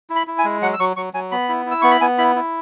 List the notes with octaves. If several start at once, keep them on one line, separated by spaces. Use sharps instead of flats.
E4
B5
E4
G#5
G#3
F#3 F#5
E6
F#3 C#6
F#3 C#6
F#3 G#5
B3 B5
E4
E4
E6
B3 C#6
B5
B3 G#5
E4 B5
E4